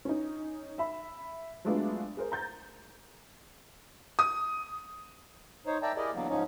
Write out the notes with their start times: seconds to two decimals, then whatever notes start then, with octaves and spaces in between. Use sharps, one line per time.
0.05 C#4 D#4
0.78 E5 B5
1.65 F#3 G#3 A3 B3 D4 F4
2.17 G#4 A#4 C5
2.32 A#5 G6 A6
4.19 D#6
5.67 D#4 C5 C#5
5.82 A#4 D5 E5 G5 A5 A#5
5.97 E4 G4 G#4 A#4 D5 D#5
6.14 D3 E3 F#3 A#3 B3
6.29 G#2 F3 C#4 D#4